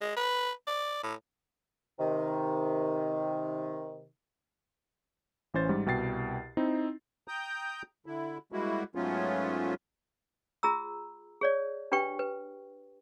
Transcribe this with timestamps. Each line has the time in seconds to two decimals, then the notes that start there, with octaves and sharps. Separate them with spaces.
0.01 G#3
0.16 B4
0.67 D5
1.03 A2
1.99 C3 D#3
5.54 A1 E3 C#4 C5 A6
5.69 G#2 G3
5.86 C2 B2 G5 A6 C7
6.57 C4 D#4 E4
7.28 G5 A#5 D#6 G6
8.06 D3 E4
8.52 G3 G#3 A#3 E4 F#4
8.95 G#2 F#3 A3 B3 C#4 F4
10.63 F4 G#4 A#5 E6
11.41 G#4 C#5 D5
11.92 D4 G4 B4 G5 C#6
12.19 B4